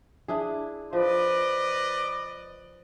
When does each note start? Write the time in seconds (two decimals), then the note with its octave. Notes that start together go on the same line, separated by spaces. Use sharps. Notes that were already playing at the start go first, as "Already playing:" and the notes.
0.28 D4 E4 G#4
0.93 F3 B4 D5 D#5